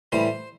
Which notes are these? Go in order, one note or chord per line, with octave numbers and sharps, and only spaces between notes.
A2 E3 G3 C5